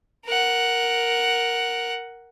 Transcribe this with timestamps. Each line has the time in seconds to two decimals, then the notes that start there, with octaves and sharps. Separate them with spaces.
0.25 A#4 F#5